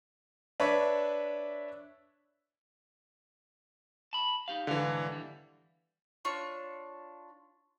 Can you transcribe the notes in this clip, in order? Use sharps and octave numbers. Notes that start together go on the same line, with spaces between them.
D4 B4 C#5 E5
A5 B5
D#4 G4 F5
C2 G#2 D3 E3 F5
D#2 G3
D4 F4 C#5 C#6